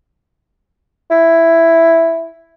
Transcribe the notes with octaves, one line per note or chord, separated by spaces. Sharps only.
E4